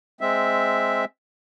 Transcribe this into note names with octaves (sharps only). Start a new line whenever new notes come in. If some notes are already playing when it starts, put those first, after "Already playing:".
G#3 C4 E5